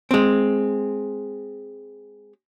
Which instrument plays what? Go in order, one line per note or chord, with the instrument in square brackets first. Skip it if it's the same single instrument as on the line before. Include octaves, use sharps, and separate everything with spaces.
[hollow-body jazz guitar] G#3 C4